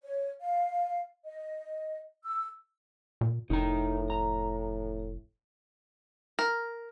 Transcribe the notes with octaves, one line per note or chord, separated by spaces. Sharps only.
C#5
F5
D#5
E6
A#2
F1 A2 D#4 A#4 A#5
A#5
A#4